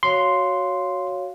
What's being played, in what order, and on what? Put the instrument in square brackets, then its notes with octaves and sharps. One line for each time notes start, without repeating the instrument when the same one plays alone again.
[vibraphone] F#4 C#5 F5 [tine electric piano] C6